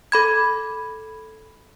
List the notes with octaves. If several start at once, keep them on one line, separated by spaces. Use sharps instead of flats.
A4 B5 G#6